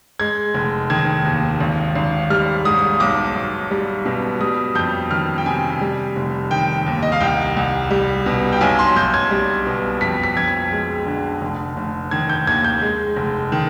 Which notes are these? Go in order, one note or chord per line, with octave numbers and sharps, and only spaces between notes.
G#3 G#6
F1
D#3 G#6
D#2
G#1
G#1
G3 F6
G#2 D#6
B1 D6
B1
G3
B2
G3 D#6
F2 G6
D#3 F6
G5
C3 G#5
G3
F1
D#3 G5
D#2
D#5
F5
C2 G5
C2
G3
B2
G5
B1 G#5
C6
B1 G6
G#6
G3
B2
F2 B6
B6
F2 G#6
G#3
D3
F1
F1
D#3 G#6
G6
D#2 G#6
G6
G#3
F1
D#3